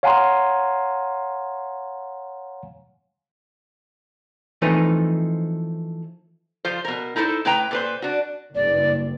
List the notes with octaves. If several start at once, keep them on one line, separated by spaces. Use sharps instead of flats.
C#5 F5 F#5 G#5 A#5 C6
E3 F3 A3 C4 D#4 B4
F3 F4 C5
B2 A#4
D#4 E4 A4 A#4 C5
A2 B4 G5 A#5
A#2 B4 C5
D4 F#4
F#1 G2 D5